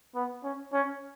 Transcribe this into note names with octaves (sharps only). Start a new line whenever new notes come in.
B3
C#4
C#4